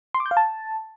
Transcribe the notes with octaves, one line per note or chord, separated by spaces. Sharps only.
C6
D6
G6
F5
A5